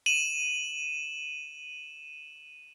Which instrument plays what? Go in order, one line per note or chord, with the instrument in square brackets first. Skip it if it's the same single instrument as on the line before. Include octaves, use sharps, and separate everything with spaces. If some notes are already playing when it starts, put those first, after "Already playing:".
[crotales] D#7 E7 F#7